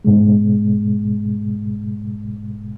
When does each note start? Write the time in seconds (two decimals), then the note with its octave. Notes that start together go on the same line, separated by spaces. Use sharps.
0.05 G#2 B2 G#3